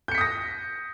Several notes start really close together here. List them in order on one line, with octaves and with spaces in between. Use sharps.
G6 C#7 B6 D#6 A#6